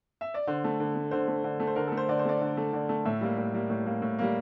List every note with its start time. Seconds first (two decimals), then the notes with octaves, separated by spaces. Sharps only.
0.21 E5
0.34 D5
0.47 D3 C5
0.64 A3
0.80 D3
0.95 A3
1.11 D3 C5
1.28 A3
1.44 D3
1.60 A3
1.67 C5
1.76 D3 A#4
1.87 A3 A4
1.97 C5
2.09 D3 D5
2.19 C5
2.25 A3 D5
2.41 D3
2.57 A3
2.73 D3 D5
2.89 A3
3.05 A2 E5
3.21 G3 A#3
3.38 A2
3.54 G3 A#3
3.70 A2
3.86 G3 A#3
4.02 A2
4.18 G3 A#3